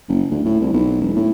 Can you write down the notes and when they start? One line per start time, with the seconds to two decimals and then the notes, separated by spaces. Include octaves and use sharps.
0.09 F#1
0.31 D2
0.45 A2
0.61 C2
0.73 B1
1.01 E1
1.16 A2